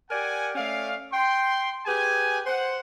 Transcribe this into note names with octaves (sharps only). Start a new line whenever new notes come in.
G4 A#4 D5 F#5 G#5
A3 C#4 D5 F5
G5 C6
G4 G#4 B4 G#5
C5 F#5